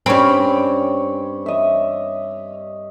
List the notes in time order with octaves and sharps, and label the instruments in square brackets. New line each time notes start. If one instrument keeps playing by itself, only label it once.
[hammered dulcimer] G2 C#5 B5 [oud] C4 C#4
[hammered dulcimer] D#5 E5